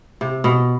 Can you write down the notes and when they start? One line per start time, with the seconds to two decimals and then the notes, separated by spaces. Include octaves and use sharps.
0.21 C3
0.44 B2